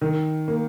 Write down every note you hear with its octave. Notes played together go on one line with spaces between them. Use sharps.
D#3
A#3